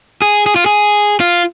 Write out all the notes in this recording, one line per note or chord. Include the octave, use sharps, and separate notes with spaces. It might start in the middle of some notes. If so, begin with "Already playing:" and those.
G#4
G#4
F4
G#4
F4